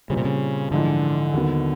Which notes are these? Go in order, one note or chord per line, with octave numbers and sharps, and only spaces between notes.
A#2 C#3 G3 C4
C3
C#3
A#1 G#2 D3 E3
D#2 D#3 F#3 B3